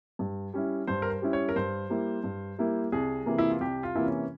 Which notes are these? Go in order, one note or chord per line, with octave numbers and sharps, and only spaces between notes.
G2
G3 C#4 E4
G2 C5
A#4
C5
G3 C#4 E4
C#5
A#4
G2 C5
G3 A#3 E4
G2
G3 A#3 E4
C2 G#4
C3 E3 A#3
E4
F4
C2 G4
F4
C3 E3 A#3 E4
C#4